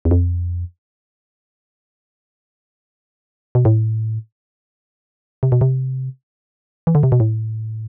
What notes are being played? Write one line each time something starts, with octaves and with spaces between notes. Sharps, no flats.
E2
F2
B2
A2
C3
B2
C3
E3
D3
C3
B2
A2